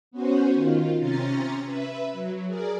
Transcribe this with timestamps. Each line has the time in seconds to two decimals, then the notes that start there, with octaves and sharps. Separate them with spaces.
0.11 B3 C#4 F#4 C5
0.52 D#3 F4
0.99 C3 C#4 A#5 C6 A6
1.64 B4 E5
2.13 F#3
2.47 G#4 A#4 D5